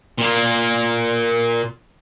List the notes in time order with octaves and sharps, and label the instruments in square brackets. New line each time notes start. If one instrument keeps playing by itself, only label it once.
[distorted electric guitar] A#2 A#3